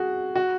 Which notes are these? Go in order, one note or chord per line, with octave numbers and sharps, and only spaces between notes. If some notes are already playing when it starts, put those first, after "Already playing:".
Already playing: F#4 G#4
F#4